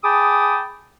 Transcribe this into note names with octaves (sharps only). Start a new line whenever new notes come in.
G#4 G5 A5 B5 D6 D#6